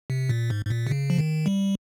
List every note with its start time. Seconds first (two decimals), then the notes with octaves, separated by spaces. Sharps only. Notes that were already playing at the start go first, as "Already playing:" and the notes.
0.10 C3
0.29 A#2
0.50 G#2
0.66 G#2
0.70 A#2
0.87 C3
0.91 C#3
1.10 F3
1.18 D#3
1.46 G3